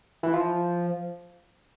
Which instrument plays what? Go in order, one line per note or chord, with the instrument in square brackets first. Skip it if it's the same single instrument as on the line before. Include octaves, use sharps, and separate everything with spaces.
[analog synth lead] E3
F3